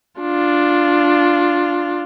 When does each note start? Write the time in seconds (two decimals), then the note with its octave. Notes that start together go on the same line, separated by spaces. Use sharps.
0.20 D4 F4